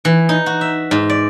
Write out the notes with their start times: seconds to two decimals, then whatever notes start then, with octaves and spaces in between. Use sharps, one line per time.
0.05 E3
0.29 D#4
0.46 F#4
0.61 E5
0.91 G#2
1.09 D5